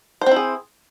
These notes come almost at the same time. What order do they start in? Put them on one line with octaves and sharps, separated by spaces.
C5 C4 E4 G#4